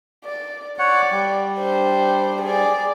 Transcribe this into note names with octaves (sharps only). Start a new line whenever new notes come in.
D5
C#5 D5 F#5
G3
D4 C5
G#4 D5